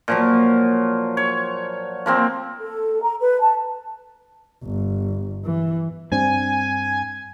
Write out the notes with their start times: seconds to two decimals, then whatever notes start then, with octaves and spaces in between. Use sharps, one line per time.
0.08 A#2 F3 F#3
1.17 C#5
2.06 F3 A#3 C4
2.59 A4
3.02 A#5
3.20 B4
3.41 A5
4.64 G1
5.45 E3
6.12 G2 C4 D4 G#5